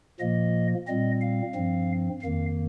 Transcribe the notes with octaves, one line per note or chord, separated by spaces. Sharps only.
A#2 F3 A#3 D#5
A#2 G3 C4 D#5
F5
G2 F3 C4
F2 D#3 A#3 F5